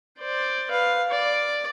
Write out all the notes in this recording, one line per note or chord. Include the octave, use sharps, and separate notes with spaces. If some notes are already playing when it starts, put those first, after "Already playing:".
C5 D5
B4 F5
D5